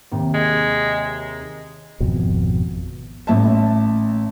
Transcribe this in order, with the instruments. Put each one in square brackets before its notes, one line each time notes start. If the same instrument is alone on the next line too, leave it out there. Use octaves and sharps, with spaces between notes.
[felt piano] D#2 C3
[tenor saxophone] G#3
[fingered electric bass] G#1 F2 B2
[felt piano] A1 E5 A5